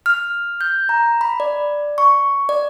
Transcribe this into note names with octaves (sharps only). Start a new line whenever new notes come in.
F6
G6
A#5
B5
D5
C#6
D5